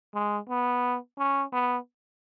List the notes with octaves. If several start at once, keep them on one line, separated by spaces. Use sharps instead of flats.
G#3
B3
C#4
B3